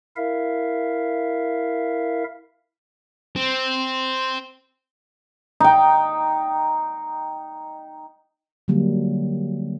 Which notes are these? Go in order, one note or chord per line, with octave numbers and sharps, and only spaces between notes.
E4 A#4 E5 F5
C4
D#4 G5
D3 F#3 G3 A#3